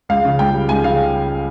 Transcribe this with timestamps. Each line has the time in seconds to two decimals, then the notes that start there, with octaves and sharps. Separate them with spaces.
0.09 C#2 F5
0.25 C#3
0.39 C#2 G5
0.54 G3
0.69 C#2 G#5
0.84 C#3 F5